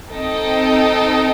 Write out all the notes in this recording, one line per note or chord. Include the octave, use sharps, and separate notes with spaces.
C4 D#4 A4 D#5 G5